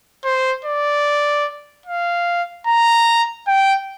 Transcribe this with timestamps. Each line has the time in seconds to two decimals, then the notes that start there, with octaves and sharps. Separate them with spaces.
0.25 C5
0.65 D5
1.86 F5
2.67 A#5
3.47 G5